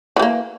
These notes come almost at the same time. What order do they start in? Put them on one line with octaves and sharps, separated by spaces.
E3 G3 A#3